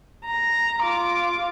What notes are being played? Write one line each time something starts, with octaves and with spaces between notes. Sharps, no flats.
A#5
F4 D6